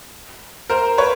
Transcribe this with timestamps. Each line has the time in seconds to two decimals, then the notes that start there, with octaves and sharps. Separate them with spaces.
0.70 A#4 C5
0.98 B4 C#5